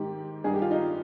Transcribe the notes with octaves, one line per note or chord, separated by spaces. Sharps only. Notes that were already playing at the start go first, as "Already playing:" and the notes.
Already playing: G#2 D#3 G4
G2 D#3 G#4
G4
F4
D#4